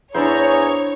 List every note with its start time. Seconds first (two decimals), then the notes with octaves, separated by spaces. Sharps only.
0.14 E2 D4 E4 G#4 C5 C#5 A#5